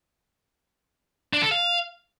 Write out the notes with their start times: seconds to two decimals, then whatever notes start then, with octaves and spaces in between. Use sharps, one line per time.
1.33 D4
1.42 A4
1.51 F5